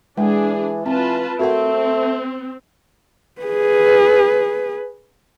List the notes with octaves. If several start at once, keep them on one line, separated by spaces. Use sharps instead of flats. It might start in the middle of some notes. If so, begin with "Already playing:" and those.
E3 G#3 D4 G#4
E3 C4 F4 B4 A5
A3 C4 F#4 A#4 F#5
G#4 B4